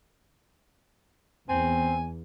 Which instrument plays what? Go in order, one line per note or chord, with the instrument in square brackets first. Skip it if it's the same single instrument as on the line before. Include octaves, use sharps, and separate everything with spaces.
[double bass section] E2 [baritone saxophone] C4 [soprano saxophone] G#5